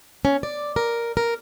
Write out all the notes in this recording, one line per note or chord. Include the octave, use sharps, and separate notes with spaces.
C#4
D5
A#4
A#4